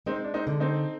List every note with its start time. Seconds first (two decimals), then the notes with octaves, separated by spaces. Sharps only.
0.06 G#3 C4 D#4
0.24 D4
0.34 C4 D#4
0.47 D3
0.60 C4 D#4